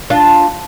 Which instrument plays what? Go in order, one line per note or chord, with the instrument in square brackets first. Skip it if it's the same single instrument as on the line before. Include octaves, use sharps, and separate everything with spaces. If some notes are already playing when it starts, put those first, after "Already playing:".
[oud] D4 F4